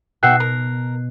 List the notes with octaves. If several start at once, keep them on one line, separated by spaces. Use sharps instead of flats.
B2 F#4 E5 G5 F#6 C7
A#4